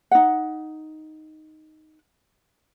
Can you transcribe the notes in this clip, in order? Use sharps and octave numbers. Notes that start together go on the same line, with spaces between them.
D#4 F#5